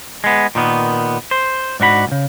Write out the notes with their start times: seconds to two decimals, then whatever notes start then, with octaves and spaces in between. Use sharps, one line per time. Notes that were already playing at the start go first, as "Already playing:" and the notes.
0.24 G#3 B3
0.55 A#2 D#3 B3
1.31 C5
1.80 G#2 D4 F#4 B5
2.07 C#2 C#3